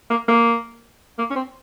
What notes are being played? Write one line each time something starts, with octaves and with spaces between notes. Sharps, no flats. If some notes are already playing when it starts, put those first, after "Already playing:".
A#3
A#3
A#3
C#4
C4